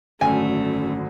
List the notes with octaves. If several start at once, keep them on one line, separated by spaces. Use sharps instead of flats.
G#1 F#2 D3 A3 C#4 G#5